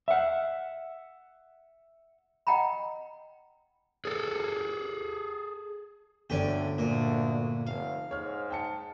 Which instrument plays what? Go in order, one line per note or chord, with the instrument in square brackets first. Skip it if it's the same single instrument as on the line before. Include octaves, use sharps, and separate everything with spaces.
[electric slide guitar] E5 F#5
[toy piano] D#5 F#5 G5 A#5 B5
[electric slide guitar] G#4 A4
[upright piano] G1 D3 D5 [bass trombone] D2 [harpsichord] C#4 G4
[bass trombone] D2 [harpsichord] A#2
[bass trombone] F1 [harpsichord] F5
[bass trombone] G#2 [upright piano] C#5 F6
[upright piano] G5 A5 C#7